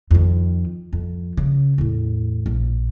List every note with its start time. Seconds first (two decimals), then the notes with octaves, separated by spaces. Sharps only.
0.11 F2 D#3
0.93 F2
1.37 C#3
1.78 E2 A2
2.46 A#1